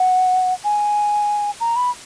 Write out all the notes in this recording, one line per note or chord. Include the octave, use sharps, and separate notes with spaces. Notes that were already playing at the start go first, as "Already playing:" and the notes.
Already playing: F#5
G#5
A#5
B5